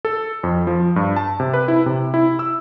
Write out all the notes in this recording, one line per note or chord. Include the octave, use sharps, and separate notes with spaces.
A4
F2
F3
G2
A5
C3
B4
E4
C3
E4
E6